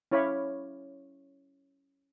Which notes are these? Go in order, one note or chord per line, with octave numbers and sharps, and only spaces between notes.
C#4 E4 C#5 F5 B5 D6